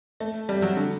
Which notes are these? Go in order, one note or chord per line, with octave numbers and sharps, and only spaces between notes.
A3
G3
F#3
D3